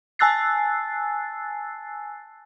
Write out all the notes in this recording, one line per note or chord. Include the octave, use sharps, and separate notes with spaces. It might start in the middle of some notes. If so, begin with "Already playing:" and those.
G#5 A5 E6 F#6 A6 C7